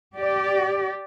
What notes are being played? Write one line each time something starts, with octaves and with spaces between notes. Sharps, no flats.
G4 D5